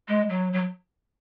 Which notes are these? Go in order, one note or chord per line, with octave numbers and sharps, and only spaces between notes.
G#3
F#3
F#3